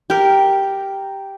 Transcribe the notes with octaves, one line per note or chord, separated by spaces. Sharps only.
G4 A#4